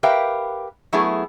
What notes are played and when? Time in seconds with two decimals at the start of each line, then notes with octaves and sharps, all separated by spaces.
0.03 G4 A#4 B4 E5 F5 G5
0.93 F#3 A3 B3 E4 G#4